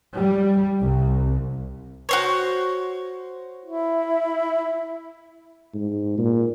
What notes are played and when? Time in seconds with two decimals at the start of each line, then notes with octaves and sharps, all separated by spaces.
0.17 G3
0.84 C2
2.09 F#4 C5 C#5
3.65 E4
5.74 G#2
6.18 A#2